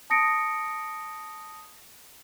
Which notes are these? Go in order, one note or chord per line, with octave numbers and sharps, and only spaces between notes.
A5 D#6 A#6 C#7 D7